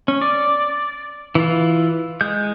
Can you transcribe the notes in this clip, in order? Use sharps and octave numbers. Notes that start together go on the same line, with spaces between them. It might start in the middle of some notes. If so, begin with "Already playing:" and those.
C#4
D5
E3 F4
G#3 G6